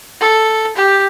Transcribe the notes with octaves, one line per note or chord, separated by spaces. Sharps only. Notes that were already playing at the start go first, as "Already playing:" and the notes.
A4
G4